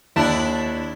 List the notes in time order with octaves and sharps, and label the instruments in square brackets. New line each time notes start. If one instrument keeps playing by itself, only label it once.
[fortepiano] D#2 A5 [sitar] D4 E4